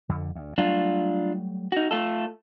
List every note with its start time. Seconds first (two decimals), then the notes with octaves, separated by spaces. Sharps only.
0.09 F2 D3
0.35 D2
0.58 F#3 G3 A3 D4 F4
1.72 D#4 F#4
1.91 A3 F4 A4